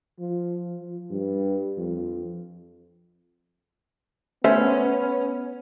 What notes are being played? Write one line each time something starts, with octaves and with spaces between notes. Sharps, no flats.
F3
F3
G2
F2
A3 B3 C#4 C5 E5